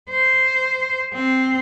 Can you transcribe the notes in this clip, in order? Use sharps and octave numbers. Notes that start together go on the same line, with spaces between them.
C5
C4